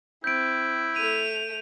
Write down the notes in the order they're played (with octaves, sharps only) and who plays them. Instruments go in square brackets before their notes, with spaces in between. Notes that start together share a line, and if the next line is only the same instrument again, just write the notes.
[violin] C4 [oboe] E4 [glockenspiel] G6 D7
[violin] A3 F7 [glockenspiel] D#7